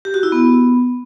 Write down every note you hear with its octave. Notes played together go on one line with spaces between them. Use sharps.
G4
F#4
E4
B3